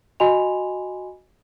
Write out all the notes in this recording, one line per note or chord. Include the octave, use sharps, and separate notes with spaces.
F#4 D#5 G#5 B5 C6 F7